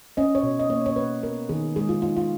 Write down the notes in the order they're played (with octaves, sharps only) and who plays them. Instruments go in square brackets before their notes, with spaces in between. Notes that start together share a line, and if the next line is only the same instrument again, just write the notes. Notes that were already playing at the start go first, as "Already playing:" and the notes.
[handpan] C#4 D#5
C#5
B2
D#5
A#3 C#5
C#5
B2 B4
B3 A#4
D#3 G#4
G#3 G#4
F4
D#4 F4
F4